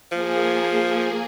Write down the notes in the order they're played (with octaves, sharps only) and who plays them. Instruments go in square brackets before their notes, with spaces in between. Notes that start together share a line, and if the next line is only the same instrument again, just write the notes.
[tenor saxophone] F3 [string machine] A#3 G#4